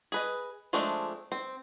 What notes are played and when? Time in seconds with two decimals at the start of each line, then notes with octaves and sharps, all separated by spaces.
0.12 G#4 B4 D#5
0.73 F3 G#3 A3 C4 D4
1.32 C4